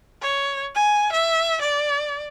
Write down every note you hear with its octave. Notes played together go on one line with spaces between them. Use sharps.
C#5
G#5
E5
D5